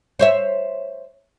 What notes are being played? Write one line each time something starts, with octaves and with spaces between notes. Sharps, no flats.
C5 C#5 E5